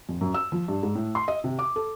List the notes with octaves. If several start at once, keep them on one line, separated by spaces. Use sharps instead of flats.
F2
F#2
E6
F3
G2
G#2
A2
C6
D#5
C3
D6
A4